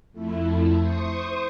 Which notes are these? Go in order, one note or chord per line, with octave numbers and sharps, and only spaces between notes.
F2 A3 E4
C5 C#6 D#6